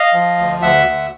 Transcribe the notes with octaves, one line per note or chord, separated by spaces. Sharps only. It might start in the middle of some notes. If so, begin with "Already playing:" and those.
Already playing: D#5 F5
F3
D2
D2 E5 F#5
D2